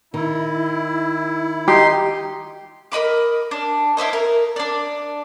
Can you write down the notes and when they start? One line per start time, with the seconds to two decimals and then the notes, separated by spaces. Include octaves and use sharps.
0.14 D#3 E4
1.68 D#4 G4 C6
2.92 A#4 D#5 B5 D6
3.51 D4
3.97 E4 B4 C5 D#5
4.13 A#4
4.56 D4 D5